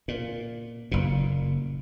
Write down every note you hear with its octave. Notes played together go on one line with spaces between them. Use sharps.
A#2
F#1 A#2